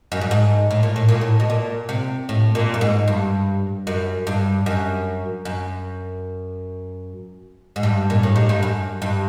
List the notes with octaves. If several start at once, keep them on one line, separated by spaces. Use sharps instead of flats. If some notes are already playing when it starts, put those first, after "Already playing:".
F#2
G2
G#2
A2
A#2
A2
A#2
A2
B2
A#2
C3
A2
A#2
G2
G#2
G2
F#2
G2
F#2
F#2
G#2
G2
A#2
A2
G#2
G2
F#2
G2